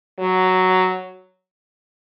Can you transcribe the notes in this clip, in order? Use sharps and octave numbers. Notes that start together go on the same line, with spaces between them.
F#3